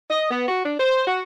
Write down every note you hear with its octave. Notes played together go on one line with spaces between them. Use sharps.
D#5
B3
F#4
D4
C5
F#4